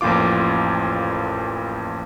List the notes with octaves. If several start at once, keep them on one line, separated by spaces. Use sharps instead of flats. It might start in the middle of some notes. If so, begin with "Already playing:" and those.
A1 F2 A#2 F4 D6